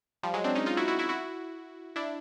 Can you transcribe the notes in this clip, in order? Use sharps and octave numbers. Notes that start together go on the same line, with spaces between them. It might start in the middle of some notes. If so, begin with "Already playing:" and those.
F3 G3
F#3 G#3
C4 D4
C#4 D#4
D#4 F4
E4 F#4
E4 F#4
E4 F#4
E4 F#4
D4 E4